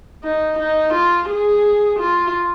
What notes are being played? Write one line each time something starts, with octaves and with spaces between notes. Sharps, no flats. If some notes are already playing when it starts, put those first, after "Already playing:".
D#4
D#4
F4
G#4
F4